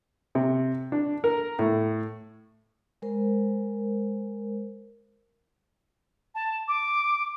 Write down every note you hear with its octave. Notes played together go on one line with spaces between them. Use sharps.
C3
D4
A#4
A2
G#3 A#4 C5
A5
D6